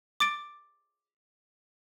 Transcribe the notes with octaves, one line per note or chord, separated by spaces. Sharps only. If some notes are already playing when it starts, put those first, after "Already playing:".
D6 A6 D7